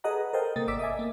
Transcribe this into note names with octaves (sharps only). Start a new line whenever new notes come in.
G#4 A4 B4 D#5 F#5 A#5
A4 A#4 C5 D#5 F5 G5
C3 A#3 D#6 A6
G#1 D5 D6 E6 B6
D#5 E5 G#5
A#3